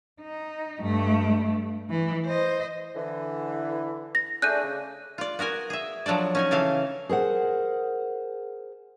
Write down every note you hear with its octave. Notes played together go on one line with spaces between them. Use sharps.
D#4
G2 A3
E3
C5 D#5
D3 E3
A#6
A3 D4 G#4 F#6 G6 D#7
C#3
F4 D5
B3 F#4 A#4 G#5
G#4 E5
F3 F#3 D4 A4 D5
C#4 D#4 G#5
C#3 E3 A4 F5
G#4 A#4 C5 F#5